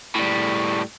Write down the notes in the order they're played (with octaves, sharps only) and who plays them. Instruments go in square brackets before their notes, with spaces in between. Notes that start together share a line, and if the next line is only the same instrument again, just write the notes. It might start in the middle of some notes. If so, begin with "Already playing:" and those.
[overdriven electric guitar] A2 G3